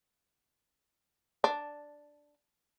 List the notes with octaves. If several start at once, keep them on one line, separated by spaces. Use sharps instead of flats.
D4